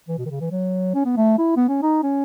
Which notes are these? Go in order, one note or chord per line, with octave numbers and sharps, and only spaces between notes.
E3
B2
D#3
C#3
E3
F#3
C#4
B3
A3
E4
B3
C#4
D#4
C#4